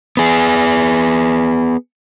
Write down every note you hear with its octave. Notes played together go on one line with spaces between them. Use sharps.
B3 G#4